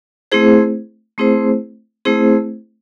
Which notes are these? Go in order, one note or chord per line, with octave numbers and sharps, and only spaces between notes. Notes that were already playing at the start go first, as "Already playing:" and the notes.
A3 C4 E4 G#4 C5
A3 C4 E4 G#4 C5
A3 C4 E4 G#4 C5